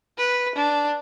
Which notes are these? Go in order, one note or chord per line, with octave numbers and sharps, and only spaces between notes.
B4
D4